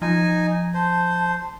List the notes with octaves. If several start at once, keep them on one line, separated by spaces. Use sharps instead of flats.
F3 D#4 G#5
C5 A5